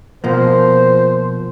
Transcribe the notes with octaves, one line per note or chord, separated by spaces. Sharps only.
B2 F3 A#3 C5